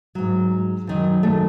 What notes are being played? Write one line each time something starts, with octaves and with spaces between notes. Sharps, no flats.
G#2 F#3
F#2 D#3 F#3
A3